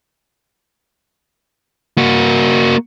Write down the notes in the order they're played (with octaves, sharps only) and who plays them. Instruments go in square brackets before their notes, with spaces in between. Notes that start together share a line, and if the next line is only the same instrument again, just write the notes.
[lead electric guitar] A#3 F#4